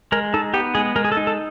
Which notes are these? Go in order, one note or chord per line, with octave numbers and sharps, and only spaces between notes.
G#3 A#4
D#4 A4
B3 G4
G#3 G#4
G#3 A#4
G#4
A4
D#4
A4